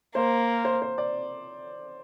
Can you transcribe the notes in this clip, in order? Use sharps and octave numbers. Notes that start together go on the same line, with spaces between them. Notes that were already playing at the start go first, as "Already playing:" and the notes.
A#3 C5
C5
C5
D5